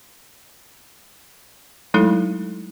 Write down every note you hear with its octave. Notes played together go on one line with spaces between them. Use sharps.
F#3 G#3 A3 D#4 E4 A4